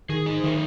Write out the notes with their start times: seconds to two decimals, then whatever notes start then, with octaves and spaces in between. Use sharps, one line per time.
0.09 D#3 G#4
0.26 D#4
0.43 D#3 A3